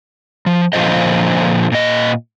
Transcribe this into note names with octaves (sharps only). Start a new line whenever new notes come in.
F3
A#2 D3 F3 F4 C5 D#5
A#2 D#5